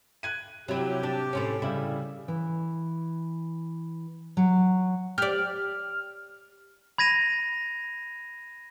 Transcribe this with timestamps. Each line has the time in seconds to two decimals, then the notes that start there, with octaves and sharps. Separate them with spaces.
0.23 F#6 G#6 D#7
0.68 C3 F#3 E4 G4
1.03 D4
1.33 A2 C3 C#4
1.62 C#3 G3 E4
2.28 E3
4.37 F#3
5.18 G4 D5 F6
6.98 B5 G#6 A#6 D#7 F7